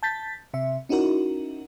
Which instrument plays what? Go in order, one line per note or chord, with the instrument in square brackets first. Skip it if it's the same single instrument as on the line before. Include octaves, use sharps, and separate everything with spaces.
[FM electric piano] A5 G6 A6 B6
C3 E5
C#4 D#4 E4 F#4 A#4